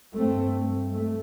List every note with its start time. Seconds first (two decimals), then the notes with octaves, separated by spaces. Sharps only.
0.16 G2 A3 C4
0.92 A3